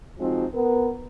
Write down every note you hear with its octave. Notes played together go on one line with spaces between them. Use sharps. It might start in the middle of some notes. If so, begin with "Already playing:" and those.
F3 G#3 C4 D#4 F#4
B3 A#4